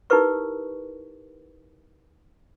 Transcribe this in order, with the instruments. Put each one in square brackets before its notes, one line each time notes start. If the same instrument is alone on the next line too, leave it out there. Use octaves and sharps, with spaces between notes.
[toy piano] D#4 E4 G4 A#4 B4 C#6